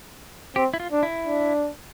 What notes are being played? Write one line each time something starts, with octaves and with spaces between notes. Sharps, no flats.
C4 G4
E4
F4
D4
E4
D4